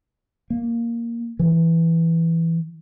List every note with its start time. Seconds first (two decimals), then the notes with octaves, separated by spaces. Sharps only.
0.50 A#3
1.39 E3